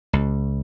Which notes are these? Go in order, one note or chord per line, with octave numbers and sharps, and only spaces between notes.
C#2